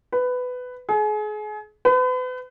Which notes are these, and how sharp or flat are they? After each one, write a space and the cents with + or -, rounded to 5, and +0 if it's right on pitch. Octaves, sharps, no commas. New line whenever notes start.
B4 +15
G#4 +35
B4 +40